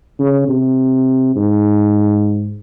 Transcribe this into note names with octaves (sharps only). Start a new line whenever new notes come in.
C#3
C3
G#2